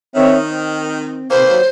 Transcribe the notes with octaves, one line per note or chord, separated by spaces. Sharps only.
D#3 C4 C#5 E5
C4
D#2 C3 A#3 B4 C5
F#3